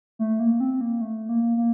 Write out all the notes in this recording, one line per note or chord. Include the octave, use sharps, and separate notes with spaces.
A3
A#3
C4
A#3
A3
A#3
A#3